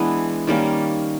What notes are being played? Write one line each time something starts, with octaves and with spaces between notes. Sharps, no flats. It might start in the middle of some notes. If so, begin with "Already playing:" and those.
Already playing: E3 G#3 B3 D4
D#3 G3 A#3 C#4